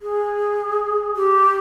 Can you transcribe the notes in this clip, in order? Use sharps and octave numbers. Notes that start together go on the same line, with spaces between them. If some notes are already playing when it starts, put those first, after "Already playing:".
G#4
G4